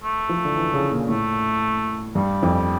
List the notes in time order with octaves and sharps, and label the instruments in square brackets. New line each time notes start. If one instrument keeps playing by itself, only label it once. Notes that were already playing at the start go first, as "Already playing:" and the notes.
[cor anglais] A3
[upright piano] F3
D3
E3
C#3
A#2
[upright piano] A2 [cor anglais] A3
[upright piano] G2 [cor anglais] G3
[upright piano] F2